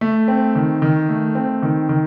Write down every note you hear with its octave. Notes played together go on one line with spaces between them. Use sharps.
A3
C4
D#3
D#3
A3
C4
D#3
D#3